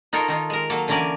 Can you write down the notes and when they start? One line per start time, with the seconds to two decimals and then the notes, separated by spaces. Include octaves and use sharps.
0.13 D#4 F4 A4 A#4 C#5
0.28 D#3 D#4 F4
0.50 G#3 A#4
0.70 F#3 A#3 A4
0.88 D3 E3 C#4 A#4 D5 G#5